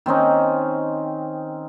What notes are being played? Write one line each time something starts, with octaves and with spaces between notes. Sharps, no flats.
D#3 C4 C#4 D#4